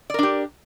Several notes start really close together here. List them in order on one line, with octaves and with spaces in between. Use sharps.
D5 A#4 D4 G4